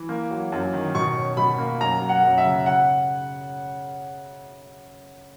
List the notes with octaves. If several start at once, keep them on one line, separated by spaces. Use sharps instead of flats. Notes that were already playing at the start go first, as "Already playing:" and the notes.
Already playing: E3
A#3
F#3
F#2
D#3
B2 C#6
C#4
B2 B5
A#3
F#2 A#5
F#3
F#5
F#2
E5
C#3
C#3 F#5